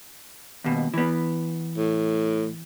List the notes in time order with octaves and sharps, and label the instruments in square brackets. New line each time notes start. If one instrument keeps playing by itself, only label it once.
[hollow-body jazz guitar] D#2 B2
E3 B3
[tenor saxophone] A2